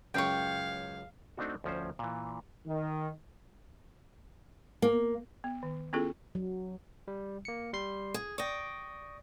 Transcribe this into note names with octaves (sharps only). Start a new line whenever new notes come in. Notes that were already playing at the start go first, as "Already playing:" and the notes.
C#2 F#2 C#5 F5 G5
A3 C4 D4 D#4 F#4
D2 F3 C#4 C5
A#2 E3
D#3
A#3
B3
D#3
B3 C#4 E4 F4 G#4 A4
F#3
G3
A#3 C#7
G3 C6 C7
G#4
D5 G5 C#6 D#6 A#6